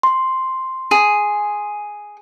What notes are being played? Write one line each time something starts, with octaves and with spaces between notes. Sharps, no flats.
C6
G#4